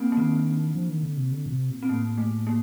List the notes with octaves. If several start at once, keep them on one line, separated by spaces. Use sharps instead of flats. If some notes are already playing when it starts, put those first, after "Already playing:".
Already playing: A#3 C4 D4
A#3
D#3 C4
F3
D#3
D3
C3
D3
A#2
C3
A#2
C4
A2 A#3
A3
A#3